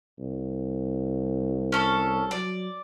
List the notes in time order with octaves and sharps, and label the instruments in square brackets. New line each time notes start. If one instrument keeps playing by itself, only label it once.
[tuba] C2
[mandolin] C#4 A4
[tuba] F#3 [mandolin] D5